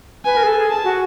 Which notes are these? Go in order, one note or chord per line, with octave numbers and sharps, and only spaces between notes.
B4 G#5
A#4
G#4
A4
G#4
A5
F#4